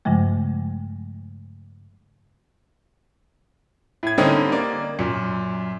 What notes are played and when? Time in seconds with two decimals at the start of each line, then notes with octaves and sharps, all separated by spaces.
0.05 G2 C#3 F3 G#3 A3
4.03 A2 G#6
4.18 D3 G3 A#3 C4 C#4 D#4
4.52 A#3 D5
4.99 F#2 A#2